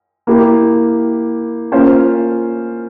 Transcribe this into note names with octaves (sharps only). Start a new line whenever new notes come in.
A#3 E4 G4
A#3 C#4 F4 C5